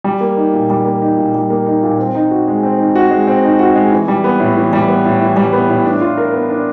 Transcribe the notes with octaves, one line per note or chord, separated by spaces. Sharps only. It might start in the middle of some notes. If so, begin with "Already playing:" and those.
G3
A#3
D#4
A#2
G3
A#3
D#4
A#2
G3
A#3
D#4
A#2
C4
D#4
F#4
G#3
C4
D#4
F#4
G#3
C4
D#4
F#4
G#3
E3
G3
B3
A2
E3
G3
B3
A2
E3
G3
B3
A2
D4
F4
A#4
B3
D4